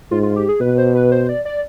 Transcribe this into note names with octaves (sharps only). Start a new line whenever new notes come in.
G#2 F4
F4
G4
G#4
B2 B4
C5
B4
C5
D5
D5